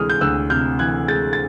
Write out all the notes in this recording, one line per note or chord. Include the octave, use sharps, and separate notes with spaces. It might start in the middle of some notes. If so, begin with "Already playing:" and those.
Already playing: D2 C3 E3 G#3 D#6 F6
G6
D2 E6 F#6
C3 F6 G6
E3 F#6 G#6
G#3 G6 A6
A6